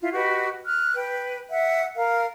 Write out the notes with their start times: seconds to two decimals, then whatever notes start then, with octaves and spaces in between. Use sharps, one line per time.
0.01 E4 F4
0.13 F#4 G4 B4 D#5
0.65 F6 F#6
0.95 B4 G5
1.50 E5 F#5
1.96 A#4 F5